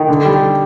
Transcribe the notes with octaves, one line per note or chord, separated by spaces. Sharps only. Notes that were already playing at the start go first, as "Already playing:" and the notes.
Already playing: D#3
D3
G3